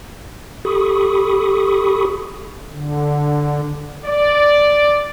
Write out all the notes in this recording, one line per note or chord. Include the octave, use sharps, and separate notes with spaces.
G4 A4 B5 C#6 D#6
D3
D5